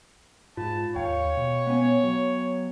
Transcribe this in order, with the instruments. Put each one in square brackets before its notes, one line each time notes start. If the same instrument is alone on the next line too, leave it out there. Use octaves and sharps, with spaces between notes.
[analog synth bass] G#2 [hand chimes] F4 [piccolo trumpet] A5
[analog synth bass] D#2 [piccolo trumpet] C#5 [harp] F5 [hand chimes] G5
[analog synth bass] B2
[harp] B3 C#4
[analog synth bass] F#3